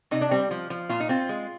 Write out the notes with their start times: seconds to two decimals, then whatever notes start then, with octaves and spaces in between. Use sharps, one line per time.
0.11 C3 D#4
0.21 D4
0.31 G3 C4
0.51 F3
0.70 F3
0.89 A#2 F4
1.00 D#4
1.09 C4 F4
1.29 G#3